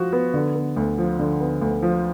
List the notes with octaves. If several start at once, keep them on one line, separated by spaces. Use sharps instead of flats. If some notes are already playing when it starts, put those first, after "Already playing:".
Already playing: F3 F#4
B3
D3
B3
D2
F3
D3
B3
D2
F3